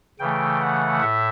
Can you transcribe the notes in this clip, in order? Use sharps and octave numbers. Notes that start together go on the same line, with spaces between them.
C#3 E3 A3 G5
F#5
A2 E5